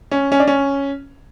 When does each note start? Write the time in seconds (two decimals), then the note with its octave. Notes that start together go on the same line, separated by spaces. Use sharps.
0.11 C#4
0.32 C#4
0.40 D4
0.47 C#4